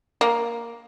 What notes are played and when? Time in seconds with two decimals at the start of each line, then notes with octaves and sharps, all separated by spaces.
0.21 A#3